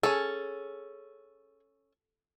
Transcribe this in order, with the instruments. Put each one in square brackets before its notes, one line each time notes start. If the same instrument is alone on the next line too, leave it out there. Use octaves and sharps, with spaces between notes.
[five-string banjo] C#4 A4 [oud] G#4